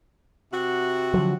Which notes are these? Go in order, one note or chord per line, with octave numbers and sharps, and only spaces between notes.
C3 F#4
D3 F3 F#3